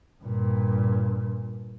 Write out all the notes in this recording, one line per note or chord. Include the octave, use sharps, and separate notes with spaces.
G2 A#2